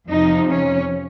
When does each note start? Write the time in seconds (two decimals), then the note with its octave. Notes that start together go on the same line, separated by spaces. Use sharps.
0.08 F2 C3 F3 D#4
0.50 C#4